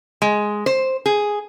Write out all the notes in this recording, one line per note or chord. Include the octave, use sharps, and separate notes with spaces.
G#3
C5
G#4